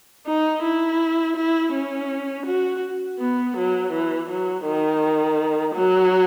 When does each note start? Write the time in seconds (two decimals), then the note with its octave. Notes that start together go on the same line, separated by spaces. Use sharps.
0.27 D#4
0.63 E4
1.36 E4
1.73 C#4
2.46 F#4
3.19 B3
3.57 F#3
3.92 E3
4.30 F#3
4.65 D#3
5.75 F#3